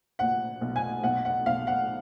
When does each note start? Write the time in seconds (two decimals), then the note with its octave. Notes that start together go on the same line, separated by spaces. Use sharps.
0.19 A#2 F#5
0.61 B1
0.76 G#5
1.04 B1 F#5
1.25 F#5
1.46 B1 F5
1.67 F#5